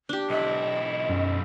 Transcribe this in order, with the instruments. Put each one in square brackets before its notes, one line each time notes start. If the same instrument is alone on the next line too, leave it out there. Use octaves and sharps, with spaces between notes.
[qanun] D4 G4
[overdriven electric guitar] B1 E4 [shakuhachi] D#5
[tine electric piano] F#2